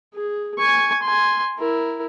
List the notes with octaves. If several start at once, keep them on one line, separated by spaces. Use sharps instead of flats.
G#4
G#5 C#6
G#5 C6
E4 A#4